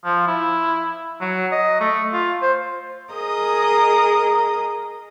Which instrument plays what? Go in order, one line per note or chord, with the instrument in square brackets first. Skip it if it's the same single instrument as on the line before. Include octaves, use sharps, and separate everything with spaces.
[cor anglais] F3
E4
F#3
D#5
A3
F4
C5
[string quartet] G#4 A#4 D#5 A#5 D#6